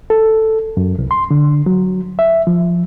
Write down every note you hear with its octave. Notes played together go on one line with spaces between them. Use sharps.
A4
F#2
C2
C6
D3
F#3
E5
F3